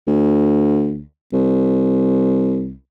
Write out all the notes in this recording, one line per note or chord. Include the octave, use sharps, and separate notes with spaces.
D2
C2